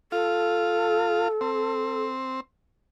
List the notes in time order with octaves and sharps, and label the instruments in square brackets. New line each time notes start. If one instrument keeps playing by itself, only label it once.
[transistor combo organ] F4 [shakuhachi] A4
[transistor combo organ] C4